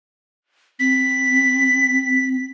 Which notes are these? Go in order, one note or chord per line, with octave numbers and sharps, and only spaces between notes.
C4 B6